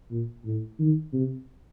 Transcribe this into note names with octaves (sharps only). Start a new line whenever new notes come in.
A#2
A2
D#3
C3